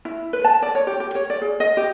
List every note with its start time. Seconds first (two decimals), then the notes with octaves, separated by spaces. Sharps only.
0.05 E4
0.33 B4
0.45 A5
0.62 D5
0.75 C#5
0.87 G4
1.00 G4
1.15 C#5
1.30 D5
1.42 G#4
1.60 D#5
1.77 G4